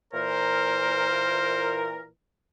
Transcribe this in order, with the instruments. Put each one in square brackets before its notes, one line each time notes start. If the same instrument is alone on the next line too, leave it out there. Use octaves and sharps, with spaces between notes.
[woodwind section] A#2 E3 A#4 [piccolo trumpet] C5